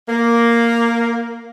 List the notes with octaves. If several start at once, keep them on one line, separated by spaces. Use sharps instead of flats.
A#3